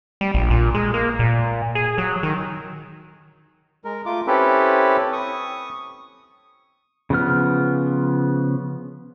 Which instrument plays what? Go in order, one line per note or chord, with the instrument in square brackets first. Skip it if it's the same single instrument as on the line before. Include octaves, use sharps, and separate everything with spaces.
[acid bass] G3
A#1
A#2
G#3
A#3
A#2
G#4
F#3
D#3
[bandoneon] G#3 A#4
A3 F4 D6
C4 C#4 E4 G4 A4 B4
C#6 D#6
[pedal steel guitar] C#3 F3 B3 F6